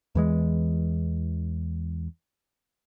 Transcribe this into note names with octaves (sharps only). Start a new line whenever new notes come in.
E2 E3 G#3